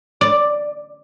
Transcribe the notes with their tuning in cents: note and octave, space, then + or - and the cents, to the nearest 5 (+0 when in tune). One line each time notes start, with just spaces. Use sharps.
D5 +5